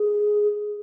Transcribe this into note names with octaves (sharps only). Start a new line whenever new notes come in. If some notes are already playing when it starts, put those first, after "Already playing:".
Already playing: G#4